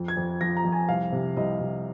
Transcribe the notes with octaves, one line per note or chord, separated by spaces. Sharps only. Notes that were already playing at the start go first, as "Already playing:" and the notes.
Already playing: F2
G#6
F2
F3 A#6
A#5
F2
G#5
C2 F5
C3
C2 D#5
C2